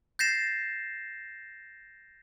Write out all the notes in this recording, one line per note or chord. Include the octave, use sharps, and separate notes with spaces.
G6 A6 A#6 C7 E7